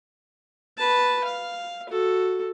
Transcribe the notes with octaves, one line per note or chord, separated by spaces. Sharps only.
B4 A5
F5
F#4 A4